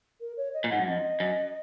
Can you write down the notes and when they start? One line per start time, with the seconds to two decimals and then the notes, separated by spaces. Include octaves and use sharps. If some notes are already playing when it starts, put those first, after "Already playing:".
0.21 A#4
0.37 C#5
0.54 D#5
0.64 A#2
0.71 G#2 F#5
0.79 F#2
0.87 F2 D#5
1.20 F#2